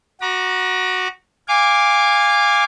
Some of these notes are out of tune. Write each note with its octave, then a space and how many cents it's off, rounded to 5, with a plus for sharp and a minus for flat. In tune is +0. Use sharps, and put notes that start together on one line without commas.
F#4 -5 A#5 +35 D6 +25
F5 +0 G#5 -25 D6 -5